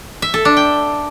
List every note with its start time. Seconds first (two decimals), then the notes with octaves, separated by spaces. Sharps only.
0.22 E5
0.34 A4
0.45 D4
0.57 G5